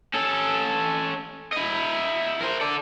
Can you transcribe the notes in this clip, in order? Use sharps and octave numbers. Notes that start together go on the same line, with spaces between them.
C#4 A4
E4 D#5
A#4 C5
A4 D5